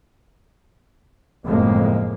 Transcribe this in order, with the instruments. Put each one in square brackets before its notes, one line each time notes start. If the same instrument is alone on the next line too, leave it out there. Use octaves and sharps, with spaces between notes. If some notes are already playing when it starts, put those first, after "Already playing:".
[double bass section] F#1 F2 A2 G#3 A#3